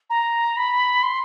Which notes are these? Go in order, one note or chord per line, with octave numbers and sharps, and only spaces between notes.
A#5
B5
C6